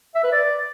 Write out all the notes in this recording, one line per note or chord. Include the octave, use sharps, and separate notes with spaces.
E5
B4
D5